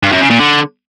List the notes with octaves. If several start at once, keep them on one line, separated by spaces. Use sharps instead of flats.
G2
F#2
C#3
A#2
D3